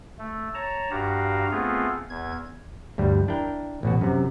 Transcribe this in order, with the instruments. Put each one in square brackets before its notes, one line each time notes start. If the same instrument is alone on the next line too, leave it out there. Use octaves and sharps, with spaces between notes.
[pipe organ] A3
C#5 A5 A#5
G2 F#4 G4 F5 A#5
A3 B3 C4 F4 G#4
E2 G#6
[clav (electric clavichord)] D2 G2 G3
D4 E4 A#4 G5
A1 B2 F#4
F#2 C3